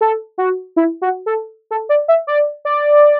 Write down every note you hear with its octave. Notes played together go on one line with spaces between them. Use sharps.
A4
F#4
E4
F#4
A4
A4
D5
E5
D5
D5